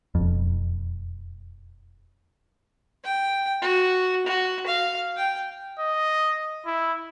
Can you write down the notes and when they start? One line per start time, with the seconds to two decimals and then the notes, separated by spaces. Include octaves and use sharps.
0.15 E1 F2
3.04 G5
3.62 F#4
4.26 F#4
4.67 F5
5.16 G5
5.80 D#5
6.66 E4